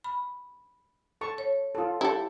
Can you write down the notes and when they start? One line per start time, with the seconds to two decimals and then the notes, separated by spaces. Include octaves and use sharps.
0.04 B5
1.21 A4 A5 C#6
1.38 C#5
1.75 F4 A4
2.01 E4 G4 A4